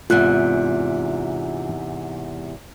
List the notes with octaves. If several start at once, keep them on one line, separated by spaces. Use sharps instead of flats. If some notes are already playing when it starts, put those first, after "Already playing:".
E2 G#2 C3 F4 F#6